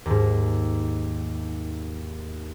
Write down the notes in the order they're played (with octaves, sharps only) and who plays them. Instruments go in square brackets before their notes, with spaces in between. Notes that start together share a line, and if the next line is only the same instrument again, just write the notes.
[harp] D#2 G#2